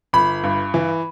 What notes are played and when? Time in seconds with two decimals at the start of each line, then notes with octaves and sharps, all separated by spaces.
0.13 G1 B5
0.44 G2
0.74 E3